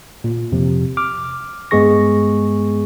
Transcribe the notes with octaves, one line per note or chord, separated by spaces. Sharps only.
A#2
F2 C3 F3
D6 F6
G2 G#3 B3 G#4 C#6 A#6